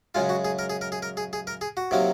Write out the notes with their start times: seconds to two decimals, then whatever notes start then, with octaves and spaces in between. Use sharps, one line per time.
0.15 F#2 C#3 G#3 F4
0.29 F#4
0.45 G#4
0.59 A#4
0.70 G#4
0.81 A#4
0.92 G#4
1.03 A#4
1.17 G#4
1.33 G#4
1.47 A#4
1.61 G#4
1.77 F#4
1.91 C3 D#3 F#3 A#3